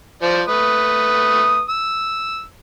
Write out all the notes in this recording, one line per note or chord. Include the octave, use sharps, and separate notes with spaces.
F3 C5 D5
A3 B4 D#6
E6